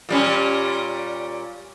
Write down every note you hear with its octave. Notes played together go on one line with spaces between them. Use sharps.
A#2 G3 C#4